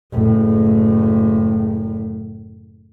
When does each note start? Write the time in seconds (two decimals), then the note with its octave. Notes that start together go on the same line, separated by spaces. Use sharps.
0.13 F#1 A2